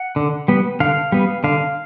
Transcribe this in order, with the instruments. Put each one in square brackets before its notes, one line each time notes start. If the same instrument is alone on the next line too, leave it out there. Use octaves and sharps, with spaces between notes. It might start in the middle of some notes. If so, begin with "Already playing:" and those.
Already playing: [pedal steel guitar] F#5
D3
G3 B3
D3 F5
G3 B3
D3 F5